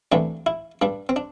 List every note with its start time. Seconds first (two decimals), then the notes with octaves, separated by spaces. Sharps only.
0.12 D2 C3 E3 G3 D4
0.46 E4
0.82 G2 G3 D4
1.09 C4
1.16 D4